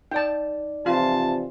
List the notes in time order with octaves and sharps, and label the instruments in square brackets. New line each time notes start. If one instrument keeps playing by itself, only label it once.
[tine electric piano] D#4 D5 [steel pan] G5 A5
[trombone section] C3 E3 F3 [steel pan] F4 [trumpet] A5